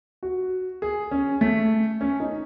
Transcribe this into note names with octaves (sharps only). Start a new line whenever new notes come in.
F#4
G#4
C#4
A3
C#4
D#4